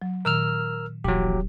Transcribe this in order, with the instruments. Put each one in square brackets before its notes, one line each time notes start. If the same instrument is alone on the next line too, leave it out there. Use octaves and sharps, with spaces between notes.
[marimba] F#3
[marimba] A#2 D#3 A#5 [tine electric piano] A#4 E6 F6
[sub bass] D#1 [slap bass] A#1 E3 [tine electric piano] F#3 G4